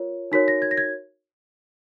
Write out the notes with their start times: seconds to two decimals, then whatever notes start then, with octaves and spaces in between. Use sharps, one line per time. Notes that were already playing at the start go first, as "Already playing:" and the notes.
Already playing: F4 A#4 C#5
0.32 D#4 F#4 A#4 C#5 B6
0.48 A#6
0.62 G#6
0.71 A#6
0.77 G#6